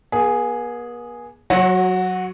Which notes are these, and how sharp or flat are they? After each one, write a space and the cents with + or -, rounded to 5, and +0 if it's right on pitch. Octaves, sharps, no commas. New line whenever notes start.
B3 -45 G#4 +0
F#3 +0 F#4 -10 C#5 -45